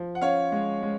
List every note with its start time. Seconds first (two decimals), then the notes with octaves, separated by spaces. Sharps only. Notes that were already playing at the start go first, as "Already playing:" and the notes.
Already playing: F3
0.15 F#5
0.21 C#4 C#5 F5
0.52 G#3
0.82 G#3